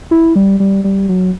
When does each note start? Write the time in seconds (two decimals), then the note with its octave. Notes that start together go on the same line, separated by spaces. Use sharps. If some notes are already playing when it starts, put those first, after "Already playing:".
0.11 E4
0.36 G3
0.60 G3
0.84 G3
1.09 F#3